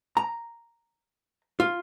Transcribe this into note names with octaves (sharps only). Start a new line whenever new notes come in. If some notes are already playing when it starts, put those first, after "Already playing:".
A#5
F4